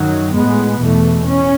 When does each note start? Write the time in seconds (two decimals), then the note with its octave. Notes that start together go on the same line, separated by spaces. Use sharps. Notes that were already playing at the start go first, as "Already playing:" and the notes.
Already playing: F#2 D#3 F#3
0.34 A2 G#3 B3
0.80 E2 B2 A3
1.26 C#4